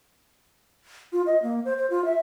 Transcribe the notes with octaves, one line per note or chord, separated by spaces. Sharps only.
F4
D#5
A#3
C5
C5
F4
E5